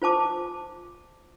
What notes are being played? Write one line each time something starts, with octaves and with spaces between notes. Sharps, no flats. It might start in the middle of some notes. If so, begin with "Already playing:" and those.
F4 C5 A5 D6